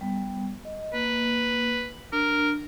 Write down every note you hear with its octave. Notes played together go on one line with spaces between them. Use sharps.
G3 B3
D#5
A#3 B4
D4 A#4